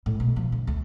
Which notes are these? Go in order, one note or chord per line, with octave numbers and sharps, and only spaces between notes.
A2
B2
F3
D3
D2